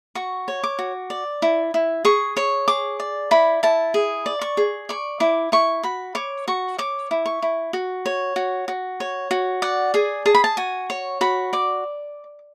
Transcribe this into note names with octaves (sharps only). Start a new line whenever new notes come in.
F#4 C#6
C#5
D6
F#4
D5
E4
E4
G#4 C#6
C#5 C#6
G#4 D6
D5
E4 B5
E4 A5
G#4
D5
C#6
G#4
D5 C#6
E4 D6
E4 C#6
F#4 B5
C#5 D6
F#4 C#6
C#5 D6
E4
C#6
E4
F#4
C#5
F#4
F#4
C#5
F#4
D5 F#5
G#4 G#5
G#4 A5
B5
A5
F#4 G#5
C#5
F#4 B5
D5 D6